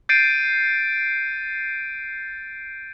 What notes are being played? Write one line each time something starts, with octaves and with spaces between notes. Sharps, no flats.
G6 A6 C7 D7 D#7